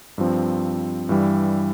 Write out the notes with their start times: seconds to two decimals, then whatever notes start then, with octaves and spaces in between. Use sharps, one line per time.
0.18 G2 F3 C4
1.09 G2 E3 G3